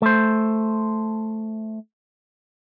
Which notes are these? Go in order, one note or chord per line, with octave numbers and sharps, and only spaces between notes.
A3 C5